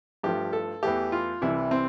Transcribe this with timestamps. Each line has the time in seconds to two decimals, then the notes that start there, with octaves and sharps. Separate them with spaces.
0.23 G2 F3 A3 G4
0.53 A4
0.83 E2 E3 A3 G4
1.12 F4
1.42 C2 C3 E3 G3 E4
1.71 C4